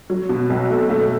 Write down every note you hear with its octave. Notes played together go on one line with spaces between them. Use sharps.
F#3
B2
B1
A3
A3